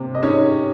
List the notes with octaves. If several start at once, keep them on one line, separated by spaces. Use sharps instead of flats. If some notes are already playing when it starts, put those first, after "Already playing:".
Already playing: C3 A#3
D#5
C#4 D#4 C#5